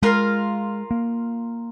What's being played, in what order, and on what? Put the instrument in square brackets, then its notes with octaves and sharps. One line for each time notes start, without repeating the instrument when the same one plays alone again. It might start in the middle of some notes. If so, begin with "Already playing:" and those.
[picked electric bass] G#3 [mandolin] F4 A#4 F5
[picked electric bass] A#3